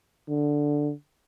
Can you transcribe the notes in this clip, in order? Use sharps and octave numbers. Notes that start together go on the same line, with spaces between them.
D3